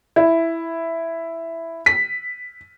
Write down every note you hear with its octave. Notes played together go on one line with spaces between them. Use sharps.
E4
B6